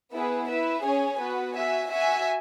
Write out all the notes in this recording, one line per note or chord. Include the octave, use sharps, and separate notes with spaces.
B3 E4 G#4 B4
E4 B4 E5
C#4 G#4 C#5 G#5
B3 F#4 B4
F#4 E5 G#5
F#4 E5 G#5